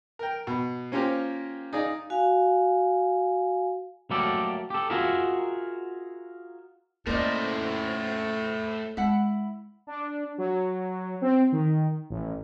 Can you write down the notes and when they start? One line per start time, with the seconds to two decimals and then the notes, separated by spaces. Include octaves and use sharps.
0.19 A#4 G5
0.47 B2
0.92 A#3 C#4 F4 G4 C5
1.73 D#4 G#4 D5 F5
2.10 F#4 F5 G#5
4.11 F#3 A3 A#3 G4 A4 D5
4.70 G4 A4
4.90 F4 F#4 G#4 A#4 E5
7.07 A2 A3 A#3 C#4 A#4 C5 D5 D#5
8.97 G#3 E4 F#5
9.87 D4
10.38 F#3
11.22 C4
11.52 D#3
12.10 A1